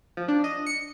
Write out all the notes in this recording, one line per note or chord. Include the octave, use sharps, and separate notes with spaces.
F3
D4
D#5
C#7